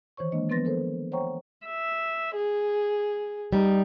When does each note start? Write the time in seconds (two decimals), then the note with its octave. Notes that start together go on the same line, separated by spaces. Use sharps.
0.17 D#3 E3 C5 C#5 C#6
0.32 G#3 A#3 D4 D#5
0.49 F3 B3 B4 C6 A6 A#6
0.65 A4 A#4 C5
1.12 C5 C#5 F#5 G5 A#5 C#6
1.67 E5
2.36 G#4
3.53 G3 D#4